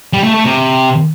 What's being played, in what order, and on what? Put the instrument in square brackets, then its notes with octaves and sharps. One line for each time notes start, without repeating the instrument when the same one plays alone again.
[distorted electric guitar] G3
A3
A3
C3